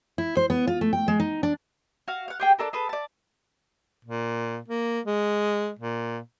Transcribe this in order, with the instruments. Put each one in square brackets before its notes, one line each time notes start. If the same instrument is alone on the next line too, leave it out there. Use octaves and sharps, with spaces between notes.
[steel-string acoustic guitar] E4
C5
B3
F4
A3
G5
G#3
D#4
D4
[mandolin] F#4 F5
F5 F#5
G4 G#4 G5
D4 A4 A#4
G#4 A4 B4
D5 A5
[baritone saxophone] A#2
A#3
G#3
A#2